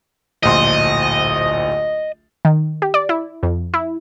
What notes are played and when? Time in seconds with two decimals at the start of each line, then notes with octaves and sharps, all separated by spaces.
0.43 D1 A#1 D#5 C6
2.45 D#3
2.82 G4
2.94 D5
3.09 E4
3.43 F2
3.74 E4